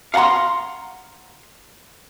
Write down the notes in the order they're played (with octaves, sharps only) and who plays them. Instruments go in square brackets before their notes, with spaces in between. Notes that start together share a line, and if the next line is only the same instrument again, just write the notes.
[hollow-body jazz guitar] F5 F#5 A5 A#5 C6